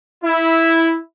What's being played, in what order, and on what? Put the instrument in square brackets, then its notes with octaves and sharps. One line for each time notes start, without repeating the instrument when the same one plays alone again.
[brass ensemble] E4